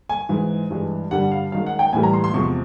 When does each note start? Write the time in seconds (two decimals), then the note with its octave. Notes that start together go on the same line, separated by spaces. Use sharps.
0.09 G#5
0.29 G#2 E3 G#3
0.70 G2 E3 G#3
1.11 G2 D3 G3 F#5
1.31 F5
1.52 F#2 D#3 G#3 F5
1.66 F#5
1.79 G5
1.93 A2 E3 G3 G#5
2.03 A#5
2.13 C6
2.24 C6
2.34 E2 C3 F3 G#3 C#6